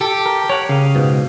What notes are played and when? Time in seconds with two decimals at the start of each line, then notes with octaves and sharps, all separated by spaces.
0.01 G4 A4
0.26 A#4
0.49 A#4 C#5 F#5
0.69 C#3 D#5 F5
0.95 G#2 B2